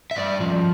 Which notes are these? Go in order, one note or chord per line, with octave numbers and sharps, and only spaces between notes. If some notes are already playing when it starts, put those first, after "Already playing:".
E5
G2 D5
F3